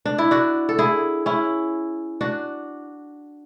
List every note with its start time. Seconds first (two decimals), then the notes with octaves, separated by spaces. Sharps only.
0.05 D4
0.18 E4
0.31 D4 F#4
0.69 A4
0.79 E4 G#4
1.26 C#4 E4
2.21 D4 F#4